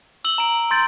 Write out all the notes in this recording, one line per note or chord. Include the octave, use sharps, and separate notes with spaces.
E6 F#7 G7
A#5 D7
C6 G6 A6 D7